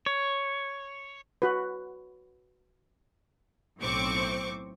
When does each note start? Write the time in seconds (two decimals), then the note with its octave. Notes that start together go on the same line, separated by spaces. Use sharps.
0.06 C#5
1.42 F#4 B4
3.81 B1 A2 C4 C#6 D6